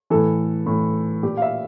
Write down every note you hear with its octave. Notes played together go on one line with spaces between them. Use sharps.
A2 E3 A4
A2 E3
A#2 G4
F5
E5